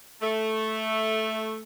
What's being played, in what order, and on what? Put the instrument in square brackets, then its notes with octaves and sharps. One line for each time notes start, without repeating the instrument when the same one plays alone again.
[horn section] A3